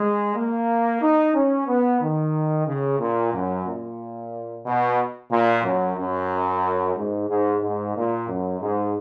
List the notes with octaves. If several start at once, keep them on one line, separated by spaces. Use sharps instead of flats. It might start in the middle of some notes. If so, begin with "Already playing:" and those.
Already playing: G#3
A#3
D#4
C#4
B3
D#3
C#3
A#2
F#2
A#2
B2
A#2
F#2
F#2
G#2
G#2
G#2
A#2
F#2
G#2